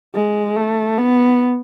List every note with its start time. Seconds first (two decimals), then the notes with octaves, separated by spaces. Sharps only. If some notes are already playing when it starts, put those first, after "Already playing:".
0.15 G#3
0.56 A3
0.98 B3